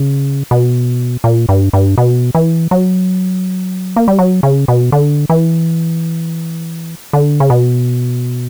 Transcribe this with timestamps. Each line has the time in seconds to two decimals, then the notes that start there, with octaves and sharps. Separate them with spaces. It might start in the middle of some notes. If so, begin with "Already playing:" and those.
Already playing: C#3
0.51 B2
1.24 A#2
1.49 G2
1.73 G2
1.98 B2
2.35 E3
2.71 F#3
3.96 A#3
4.08 G3
4.19 F#3
4.43 C#3
4.68 B2
4.92 D3
5.30 E3
7.13 D3
7.40 C#3
7.50 B2